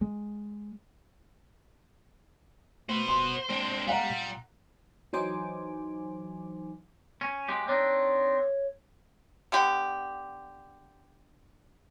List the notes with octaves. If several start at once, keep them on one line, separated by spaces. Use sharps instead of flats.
G#3
A3 F#4 B4 C5
D#1 C6
G#3 C4 D4
G3 F5 F#5 A#5
A#2
E3 F#3 D#4 C5 G#5 D6
C#4
F#3 G#3 G4
C4 D4 D#4 C#5
D3 B3 G4